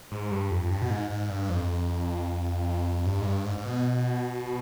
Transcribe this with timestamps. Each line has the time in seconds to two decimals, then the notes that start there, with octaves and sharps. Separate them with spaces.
0.12 G#2
0.31 G2
0.51 F2
0.71 G2
0.82 B2
0.90 G#2
1.10 G#2
1.30 G2
1.49 F2
3.06 G2
3.21 G#2
3.26 G2
3.45 G#2
3.58 G#2
3.65 B2